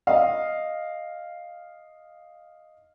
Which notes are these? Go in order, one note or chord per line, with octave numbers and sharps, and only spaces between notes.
D#5 F5